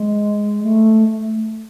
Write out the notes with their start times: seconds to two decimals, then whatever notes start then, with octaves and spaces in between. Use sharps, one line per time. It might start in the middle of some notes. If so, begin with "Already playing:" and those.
Already playing: G#3
0.62 A3